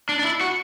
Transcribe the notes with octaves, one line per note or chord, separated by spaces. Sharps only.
D4
D4
E4
F#4